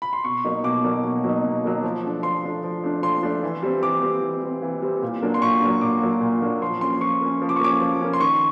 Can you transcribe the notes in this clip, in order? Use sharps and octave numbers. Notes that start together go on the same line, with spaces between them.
B5
C6
B2 C#6
F#3 A#3 D#4
B2 D6
F#3 A#3 D#4
B2
F#3 A#3 D#4
B2
F#3 A#3 D#4
F3
A3 D4
F3 C6
A3 D4
F3
A3 D4
F3 C6
A3 D4
E3
G3 C4
E3 D6
G3 C4
E3
G3 C4
E3
G3 C4
A#2
F#3 A#3 D4
C6
A#2 C#6
F#3 A#3 D4
A#2 D6
F#3 A#3 D4
A#2
F#3 A#3 D4
F3 C6
A#3 C#4 C6
F3 C#6
A#3 C#4
F3
D6
C#6
A#3 C#4 D6
F3
A#3 C#4
C6
D#3 C#6